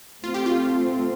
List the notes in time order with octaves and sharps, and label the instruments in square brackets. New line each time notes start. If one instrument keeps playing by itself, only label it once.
[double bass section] A3 C4 [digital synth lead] F4
[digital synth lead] G4
F4